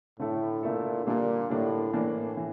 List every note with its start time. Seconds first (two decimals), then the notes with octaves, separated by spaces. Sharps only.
0.19 A2 D3 A3 E4 A4
0.63 A#2 D3 A3 E4 A4
1.06 A#2 D3 G3 A#3 D4
1.50 A2 D3 G3 A#3 D4
1.93 A2 E3 A#3 D4
2.37 E3